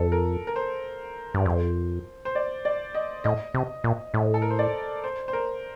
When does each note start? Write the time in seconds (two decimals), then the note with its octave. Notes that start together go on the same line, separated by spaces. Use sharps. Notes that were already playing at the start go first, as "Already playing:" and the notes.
Already playing: F2 A4
0.12 A#4
0.47 A#4
0.56 C5
1.34 G2
1.46 F2
2.25 C5
2.35 D5
2.65 D5
2.95 D#5
3.24 A2 D#5
3.54 C3
3.84 A#2
4.14 A2
4.34 A4
4.42 A#4
4.50 C5
4.59 D5
5.04 C5
5.28 C5
5.33 A#4